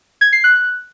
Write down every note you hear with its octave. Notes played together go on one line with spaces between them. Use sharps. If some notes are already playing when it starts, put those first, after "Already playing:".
G#6
C7
F#6